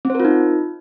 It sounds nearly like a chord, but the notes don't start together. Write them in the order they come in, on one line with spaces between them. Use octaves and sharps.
C4 C5 A#4 F4 D#4